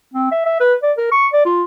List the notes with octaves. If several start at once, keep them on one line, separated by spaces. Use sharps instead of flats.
C4
E5
E5
B4
D5
A#4
C#6
D5
F4